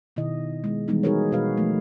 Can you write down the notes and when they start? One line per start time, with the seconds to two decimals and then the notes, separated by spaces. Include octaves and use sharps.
0.16 B2 D#3 E4 D#5
0.64 G#3 B3 E4
0.88 E3 G3 G#3 B3 D#4
1.03 D#4 F#4 G#4 A#4 B4 C#5
1.32 B2 F#4 B4 F5
1.57 F3 A3